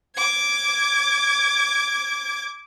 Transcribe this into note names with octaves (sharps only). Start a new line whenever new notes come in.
D6 G#6